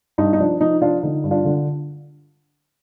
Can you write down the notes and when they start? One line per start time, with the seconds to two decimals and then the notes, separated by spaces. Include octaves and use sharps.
0.18 G2 D#4
0.33 D#4
0.39 F3 D4
0.60 F3 D#4
0.82 F3 D4 F4
1.03 D3 D#4
1.24 G2
1.31 D4 F4
1.45 D3